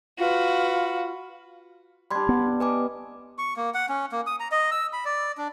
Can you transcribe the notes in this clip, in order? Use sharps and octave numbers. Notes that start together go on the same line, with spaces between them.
F4 F#4 B4
G3 D4 B5 C6 G#6
B3
B4 D#5 G#5 D6
C#6
A#3
F#5
C#4
A#3
D#6
A#5
D#5
E6
B5
D5
D4